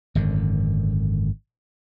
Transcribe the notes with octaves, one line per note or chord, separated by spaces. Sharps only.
G#1 F#2 D3